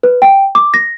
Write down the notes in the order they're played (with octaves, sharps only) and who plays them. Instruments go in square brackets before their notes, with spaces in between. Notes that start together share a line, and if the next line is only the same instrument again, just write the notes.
[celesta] B4
G5
D6
A#6